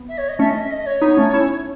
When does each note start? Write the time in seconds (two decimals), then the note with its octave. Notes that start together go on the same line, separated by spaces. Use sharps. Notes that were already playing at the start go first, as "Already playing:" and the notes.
Already playing: B3
0.08 E5
0.17 C#5
0.28 D#5
0.39 A3 C#4 E5
0.49 D#5
0.60 E5
0.70 D#5
0.86 C#5
1.02 B3 D#4
1.17 A3 C#4
1.33 C#4 E4